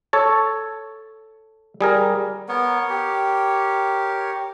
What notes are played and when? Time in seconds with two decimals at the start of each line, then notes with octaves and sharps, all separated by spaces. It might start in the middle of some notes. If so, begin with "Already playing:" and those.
0.13 A4 C#5 A5
1.81 G3 G#4 A#4
2.49 B3 A#4 C#5
2.90 G4